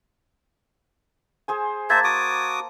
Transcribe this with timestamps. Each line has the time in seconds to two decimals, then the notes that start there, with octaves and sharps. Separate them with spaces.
1.48 G#4 C5 G#5
1.90 A#3 C5 E5 A5 G#6 A6
2.04 F#4 D6 D#6